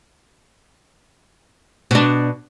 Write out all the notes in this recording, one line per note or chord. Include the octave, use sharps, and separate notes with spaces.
B2 D4